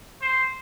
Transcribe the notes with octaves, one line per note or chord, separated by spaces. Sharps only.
C5